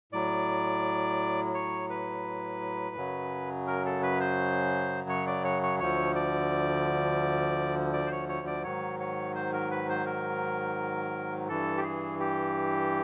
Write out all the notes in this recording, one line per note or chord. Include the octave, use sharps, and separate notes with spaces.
A2 F#3 D5
C#5
B4
F#2 C#3 F#3
A#4
A4
B4
C5
C#5
D5
C#5
C#5
D2 D3 F3 C#5
D5
D5
C5
C#5
C#5
D5
G#2 D#3 F#3 C#5
C#5
C5
A#4
B4
C5
A#4
G2 E3 A4
G4
G#4
G4